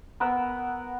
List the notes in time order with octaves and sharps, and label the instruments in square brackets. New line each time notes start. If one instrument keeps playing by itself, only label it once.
[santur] B3 A#4 F#5 E6